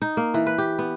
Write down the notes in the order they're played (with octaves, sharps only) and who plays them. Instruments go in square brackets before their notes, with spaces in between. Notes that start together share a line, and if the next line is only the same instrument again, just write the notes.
[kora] D#4
A#3
E3
B4
G4
B3